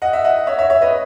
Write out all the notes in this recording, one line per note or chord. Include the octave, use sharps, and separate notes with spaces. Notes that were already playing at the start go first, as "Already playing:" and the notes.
D#5 F#5
E5
D#5 F#5
C#5 E5
C#5 E5
C#5 E5
B4 D#5